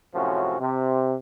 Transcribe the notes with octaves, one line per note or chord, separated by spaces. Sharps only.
F#2 A2 C3 F3 C#4 F#4
C3